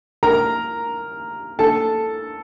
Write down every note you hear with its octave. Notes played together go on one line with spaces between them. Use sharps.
A#4 A#5
A4 A5